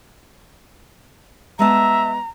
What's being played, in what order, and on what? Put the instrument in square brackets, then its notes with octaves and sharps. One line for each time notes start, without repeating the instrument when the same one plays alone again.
[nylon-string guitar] G#3 B3 A5 [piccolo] E5 [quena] A#5